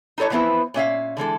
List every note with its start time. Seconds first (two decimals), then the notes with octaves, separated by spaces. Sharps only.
0.18 D#4 E4 A4 C#5 D#5
0.30 E3 F3 B3 C4 E4 B4
0.74 A#2 C#4 E5 F5
1.17 D3 E3 G#3 A4